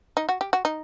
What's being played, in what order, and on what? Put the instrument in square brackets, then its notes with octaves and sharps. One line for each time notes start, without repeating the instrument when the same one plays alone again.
[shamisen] D#4
F#4
G4
F#4
D#4